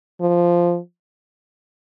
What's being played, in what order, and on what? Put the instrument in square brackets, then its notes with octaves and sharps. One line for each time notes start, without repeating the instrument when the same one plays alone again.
[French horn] F3